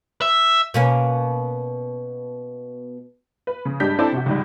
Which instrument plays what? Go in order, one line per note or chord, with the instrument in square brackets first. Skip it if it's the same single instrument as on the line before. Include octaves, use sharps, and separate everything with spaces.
[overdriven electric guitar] E5
[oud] B2 A#3 C#4
[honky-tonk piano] B4
C#3
G2 G#3 D4 G4 G6 B6
C4 D4 E4 A4 C5 D5
C3 F#4
C#2 G#2 G3